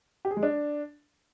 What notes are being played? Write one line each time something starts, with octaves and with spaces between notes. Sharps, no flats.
G4
G#4
G#3
D4